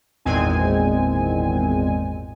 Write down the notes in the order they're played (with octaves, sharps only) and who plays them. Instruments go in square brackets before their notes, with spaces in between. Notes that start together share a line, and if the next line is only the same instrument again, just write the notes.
[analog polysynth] G#1 E2 A#2 G#3 C4 G#5